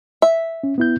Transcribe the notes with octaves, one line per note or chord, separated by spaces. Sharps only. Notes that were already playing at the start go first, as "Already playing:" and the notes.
E5
C#4
B3 E4 G6